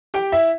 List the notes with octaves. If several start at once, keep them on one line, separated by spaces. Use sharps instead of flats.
G4 G5
E4 E5